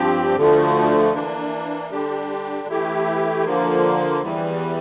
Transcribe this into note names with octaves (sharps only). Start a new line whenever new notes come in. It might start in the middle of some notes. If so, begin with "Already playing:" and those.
Already playing: G2 F3 C4 G4
D2 D3 F3 A3
E3 A#3 D4
D3 G3 D4 G4
E3 A3 E4 G4
D3 F3 A#3
E2 E3 G3